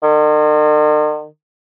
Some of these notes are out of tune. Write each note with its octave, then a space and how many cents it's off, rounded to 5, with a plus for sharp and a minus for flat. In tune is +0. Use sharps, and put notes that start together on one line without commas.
D#3 -45